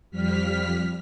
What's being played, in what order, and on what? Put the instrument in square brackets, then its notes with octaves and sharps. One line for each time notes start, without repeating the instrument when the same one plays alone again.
[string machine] F2 F3 G3 F6 B6